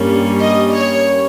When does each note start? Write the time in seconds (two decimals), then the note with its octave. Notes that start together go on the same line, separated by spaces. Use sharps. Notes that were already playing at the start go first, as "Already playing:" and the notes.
Already playing: G2 G3 A#3 C#4
0.39 D#5
0.72 C#5